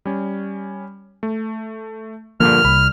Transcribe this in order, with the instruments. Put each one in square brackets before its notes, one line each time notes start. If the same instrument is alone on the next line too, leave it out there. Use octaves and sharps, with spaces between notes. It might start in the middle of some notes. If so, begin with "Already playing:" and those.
[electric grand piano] G3 C#4
A3
[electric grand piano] G2 A#2 D3 [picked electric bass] F3 A#3 [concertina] F6
[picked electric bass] C2 [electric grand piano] B5